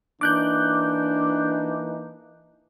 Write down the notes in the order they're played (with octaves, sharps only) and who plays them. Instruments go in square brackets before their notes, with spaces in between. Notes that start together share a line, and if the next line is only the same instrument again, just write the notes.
[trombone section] E3 A#3 D#4 [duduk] D4 [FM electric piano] D6 F#6 G6